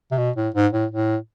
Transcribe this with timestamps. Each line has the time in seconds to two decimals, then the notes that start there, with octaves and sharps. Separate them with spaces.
0.12 C3
0.18 B2
0.36 A2
0.55 G#2
0.73 A2
0.91 A2